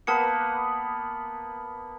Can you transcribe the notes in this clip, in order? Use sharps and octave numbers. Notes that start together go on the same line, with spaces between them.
A#3 B3 B4 A5 C#7